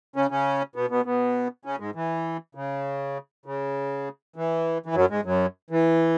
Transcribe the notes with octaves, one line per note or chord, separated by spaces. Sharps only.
C#3 C#4
C#3 C#4
B2 B3
B2 B3
B2 B3
C#3 C#4
G#2 G#3
E3
C#3
C#3
E3
E3
F#2 F#3
G#2 G#3
F#2 F#3
E3